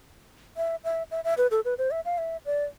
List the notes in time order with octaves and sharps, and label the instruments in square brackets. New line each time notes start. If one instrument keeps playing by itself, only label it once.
[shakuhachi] E5
E5
E5
E5
B4
A4
B4
C5
E5
F5
E5
D5